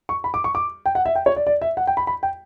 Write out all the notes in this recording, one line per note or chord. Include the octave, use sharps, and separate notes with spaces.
C#6
B5
D6
C#6
D6
G5
F#5
E5
G5
C#5
D5
D5
E5
F#5
G5
B5
B5
G5